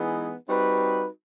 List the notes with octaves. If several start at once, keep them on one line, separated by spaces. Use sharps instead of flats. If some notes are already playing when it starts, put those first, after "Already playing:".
Already playing: E3 G#3 B3 D#4 G#4
G3 C4 D#4 F#4 B4